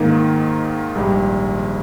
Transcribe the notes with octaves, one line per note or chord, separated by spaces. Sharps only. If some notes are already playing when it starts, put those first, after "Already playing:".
Already playing: G#2 D#3 A#3 D#4
A#1 G#2 G3